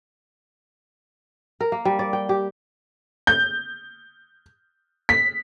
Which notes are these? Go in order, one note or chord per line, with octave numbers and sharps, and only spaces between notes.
A#4
A#3
G3
D5
G5
G4
G6
B6